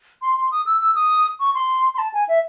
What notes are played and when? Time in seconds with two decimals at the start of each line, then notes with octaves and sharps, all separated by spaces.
0.22 C6
0.37 C6
0.51 D#6
0.66 E6
0.81 E6
0.95 D#6
1.40 C#6
1.55 C6
1.94 C6
1.98 A5
2.14 G#5
2.28 E5